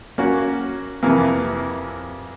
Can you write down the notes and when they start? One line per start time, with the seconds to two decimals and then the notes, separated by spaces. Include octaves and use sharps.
0.18 A#3 C#4 F#4
1.03 F2 C3 E3 A#3